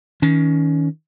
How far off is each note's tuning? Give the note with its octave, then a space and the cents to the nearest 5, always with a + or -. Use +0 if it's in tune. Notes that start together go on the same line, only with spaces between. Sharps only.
D#3 +30 C#4 +20